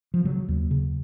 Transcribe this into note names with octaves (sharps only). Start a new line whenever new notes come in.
F3
C#3 F#3
D#2
C#3